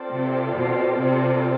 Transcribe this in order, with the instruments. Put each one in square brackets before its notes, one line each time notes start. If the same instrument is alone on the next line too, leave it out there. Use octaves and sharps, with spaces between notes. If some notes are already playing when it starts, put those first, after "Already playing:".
Already playing: [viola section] C4 F4 A4 D5
[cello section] C3
B2
C3